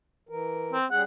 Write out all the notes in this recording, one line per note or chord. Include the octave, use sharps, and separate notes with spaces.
E3 A#4
C4
G3 C#4 G#4 F#5